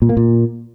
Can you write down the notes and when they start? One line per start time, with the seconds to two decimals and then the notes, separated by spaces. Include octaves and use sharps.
0.02 A#2
0.09 A#3
0.17 A#2